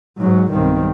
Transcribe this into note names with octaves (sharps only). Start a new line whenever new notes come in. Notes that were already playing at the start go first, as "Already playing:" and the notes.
G#2 F#3
B1 G2 D#3 C4